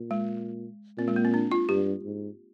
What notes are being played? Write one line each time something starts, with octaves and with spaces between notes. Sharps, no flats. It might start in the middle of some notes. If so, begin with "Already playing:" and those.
Already playing: A#2
G#3
A#2 C4
G#3
A#3
C4
D4
F4
G2 G4
G#2